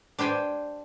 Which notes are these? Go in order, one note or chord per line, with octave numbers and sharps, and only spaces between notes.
D4 G4 C5 G5 G#5